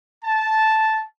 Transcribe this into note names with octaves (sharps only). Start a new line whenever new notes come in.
A5